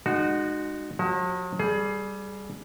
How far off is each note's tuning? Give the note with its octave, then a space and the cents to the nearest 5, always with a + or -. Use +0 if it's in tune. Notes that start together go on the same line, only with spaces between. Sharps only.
G#3 +0 D#4 -35 F#4 +0
F#3 -45 F#4 +35
G3 +0 G#4 +25